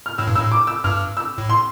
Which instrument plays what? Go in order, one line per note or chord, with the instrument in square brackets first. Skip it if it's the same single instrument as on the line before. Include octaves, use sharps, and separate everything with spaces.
[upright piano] F6
[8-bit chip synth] A2 [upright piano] E6
[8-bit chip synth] G2
[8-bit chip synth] A2 [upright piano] E6
[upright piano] D6
E6
[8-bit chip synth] G2 [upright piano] F6
[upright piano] E6
[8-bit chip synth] A2
[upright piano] C6